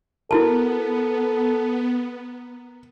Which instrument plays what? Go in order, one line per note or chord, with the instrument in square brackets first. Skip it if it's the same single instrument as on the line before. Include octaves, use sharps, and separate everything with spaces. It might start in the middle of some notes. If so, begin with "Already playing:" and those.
[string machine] B3 [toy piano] E4 F#4 A5 [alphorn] A4 [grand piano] A#4